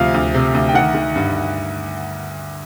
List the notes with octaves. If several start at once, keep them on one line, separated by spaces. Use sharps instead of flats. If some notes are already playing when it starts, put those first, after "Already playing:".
Already playing: D2 C3 F3 F5
D2
C3
D2
G5
D#3 F#5
D#3
G2